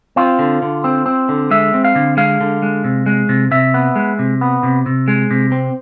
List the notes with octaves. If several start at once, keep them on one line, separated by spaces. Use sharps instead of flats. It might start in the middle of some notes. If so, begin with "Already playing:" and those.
C4 F4
D3
D3
C4
C4
D3
G#3 E5
C4
F5
D3
G#3 F5
D3
G#3
C3
G#3
C3
C3 E5
B3
G#3
C3
B3
C3
C3
G#3
C3
C4